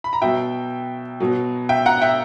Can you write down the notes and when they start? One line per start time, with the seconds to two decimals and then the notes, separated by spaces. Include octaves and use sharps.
0.04 B5
0.13 A#5
0.22 B2 F#3 E5 G5
1.20 B2 F#3
1.69 E5 G5
1.86 F#5 A#5
2.01 E5 G5